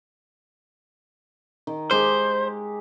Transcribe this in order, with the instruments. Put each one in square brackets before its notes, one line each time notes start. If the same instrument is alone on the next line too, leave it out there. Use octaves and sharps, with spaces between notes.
[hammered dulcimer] D#3
[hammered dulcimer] G#3 G4 D6 [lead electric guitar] C5